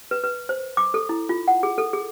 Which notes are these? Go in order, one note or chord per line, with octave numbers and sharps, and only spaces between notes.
B4
B4
C5
D6
A4
E4
F4
F#5
G#4
A4
G#4